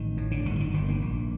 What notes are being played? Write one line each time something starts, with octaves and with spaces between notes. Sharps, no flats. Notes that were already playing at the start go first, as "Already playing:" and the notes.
Already playing: A1 D#3
A2
D3
G1 D#3
F3
D#3
G1 D#3
A#3
A#1